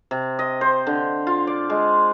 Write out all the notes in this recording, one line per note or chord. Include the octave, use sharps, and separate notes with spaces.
C3
D#5
C5
D3
F4
D5
G#3